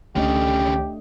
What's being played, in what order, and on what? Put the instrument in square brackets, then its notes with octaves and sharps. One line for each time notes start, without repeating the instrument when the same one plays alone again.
[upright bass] C#2 [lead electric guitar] D3 C#4 [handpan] A3 D4 D#5 [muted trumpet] G4